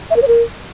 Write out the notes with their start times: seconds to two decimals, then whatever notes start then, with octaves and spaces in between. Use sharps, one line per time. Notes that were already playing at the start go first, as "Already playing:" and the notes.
0.11 E5
0.16 A#4
0.22 C#5
0.28 A#4